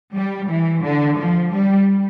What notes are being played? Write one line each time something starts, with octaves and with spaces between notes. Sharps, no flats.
G3
E3
D3
F3
G3